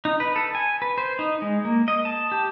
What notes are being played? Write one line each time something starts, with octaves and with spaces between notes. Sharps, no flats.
D#4
B4
A4
G#5
B4
C5
D#4
G#3
A#3
D#5
A5
G4